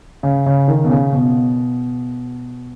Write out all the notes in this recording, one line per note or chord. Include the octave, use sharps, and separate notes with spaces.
C#3
C#3
D#3
B2
C#3
B2